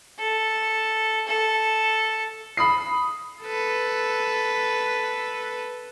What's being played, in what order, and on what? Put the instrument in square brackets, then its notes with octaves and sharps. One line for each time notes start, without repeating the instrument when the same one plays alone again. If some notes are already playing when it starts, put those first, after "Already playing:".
[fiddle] A4
A4
[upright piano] B5 D#6 C7
[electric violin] A4 B4